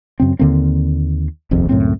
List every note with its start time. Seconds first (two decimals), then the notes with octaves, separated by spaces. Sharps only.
0.20 F#2 C#3 C4
0.39 D#2 D3 A#3 C4
1.51 D#1 A#1 F2 C3
1.69 C#2 F#2 A2 C4